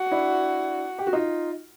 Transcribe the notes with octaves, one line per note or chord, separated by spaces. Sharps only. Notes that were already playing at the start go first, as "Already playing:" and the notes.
Already playing: F#4
D4 E4
G4
F#4
D#4 F4